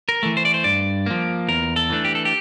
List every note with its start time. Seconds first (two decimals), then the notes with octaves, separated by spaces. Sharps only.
0.09 A#4
0.23 E3 A3
0.37 C5
0.45 D5
0.54 C5
0.64 G2 D5
1.06 F3 A#3
1.48 E2 A#4
1.76 A4
1.90 E3 A3 D4
2.05 G4
2.15 A4
2.25 G4